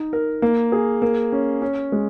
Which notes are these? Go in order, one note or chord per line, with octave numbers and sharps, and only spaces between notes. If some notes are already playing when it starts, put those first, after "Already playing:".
Already playing: D#4
A#4
A#3
G#4
A#3
C#4
C#4
G#3